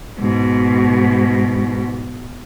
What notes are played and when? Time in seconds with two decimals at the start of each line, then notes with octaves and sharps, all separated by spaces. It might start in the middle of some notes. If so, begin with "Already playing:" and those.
0.19 G#2 B2